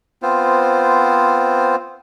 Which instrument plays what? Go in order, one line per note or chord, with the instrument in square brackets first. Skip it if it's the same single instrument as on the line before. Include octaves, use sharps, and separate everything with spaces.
[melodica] B3 C4 F4 C5